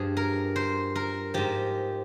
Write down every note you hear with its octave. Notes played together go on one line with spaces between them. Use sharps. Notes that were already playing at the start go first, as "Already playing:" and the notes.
Already playing: G2 F3 G#4
A#4
C5
A#4
G#2 F3 G4